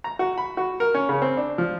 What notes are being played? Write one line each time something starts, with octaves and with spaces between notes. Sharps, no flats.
A#5
F#4
B5
F#4
A#4
C#4
C#3
C4
D4
F3